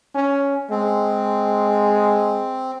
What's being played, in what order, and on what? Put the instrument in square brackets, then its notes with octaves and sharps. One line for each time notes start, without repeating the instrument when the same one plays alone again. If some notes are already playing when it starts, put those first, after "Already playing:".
[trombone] C#4
[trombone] G#3 [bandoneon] C4